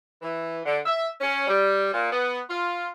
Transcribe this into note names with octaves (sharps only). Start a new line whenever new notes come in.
E3
D3
E5
C#4
G3
A#2
B3
F4